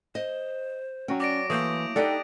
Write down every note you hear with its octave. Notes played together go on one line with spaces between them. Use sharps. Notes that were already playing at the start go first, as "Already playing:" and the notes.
C5 D#5
F#3 C#4 F#4 G5
D5 D6 A#6 D7
E3 A3 A#3 D#6 G6
D4 D#4 G4 A4 D#5 F#5 G5